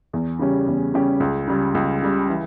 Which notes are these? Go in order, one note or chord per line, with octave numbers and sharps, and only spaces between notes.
E2
C#3 G3 C#4 G4
E2
C#3 G3 C#4 G4
C#2
C#3 G3
C#2
C#3 G3
E3